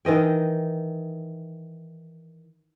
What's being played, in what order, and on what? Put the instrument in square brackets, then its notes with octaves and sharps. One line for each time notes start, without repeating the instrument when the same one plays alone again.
[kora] D#3 E3 D#5 G5